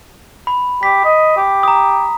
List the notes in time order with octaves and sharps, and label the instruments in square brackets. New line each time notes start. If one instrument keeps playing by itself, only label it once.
[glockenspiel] B5
[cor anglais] G4 [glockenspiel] B6
[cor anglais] D#5
G4
[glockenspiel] A#5 D#6